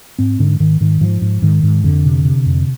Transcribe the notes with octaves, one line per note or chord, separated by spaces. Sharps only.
G#2 C4
G#2 D3
G#2 D#3
G#2 D#3
G#2 F3
G#2
G#2 D#3
G#2
F2 D3
C3
C3
F2